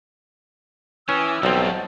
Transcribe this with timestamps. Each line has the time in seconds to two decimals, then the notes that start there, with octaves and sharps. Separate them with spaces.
1.09 E3 C#4 G5 D#6 E6
1.43 B1 F#3 G3 C4
1.57 F#5 A5 C#6